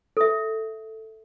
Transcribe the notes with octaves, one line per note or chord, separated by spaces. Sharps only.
A4 E5